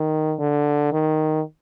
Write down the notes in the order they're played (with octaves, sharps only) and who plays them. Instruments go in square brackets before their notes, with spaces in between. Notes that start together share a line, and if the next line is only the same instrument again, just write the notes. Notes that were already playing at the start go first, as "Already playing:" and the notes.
Already playing: [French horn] D#3
D3
D#3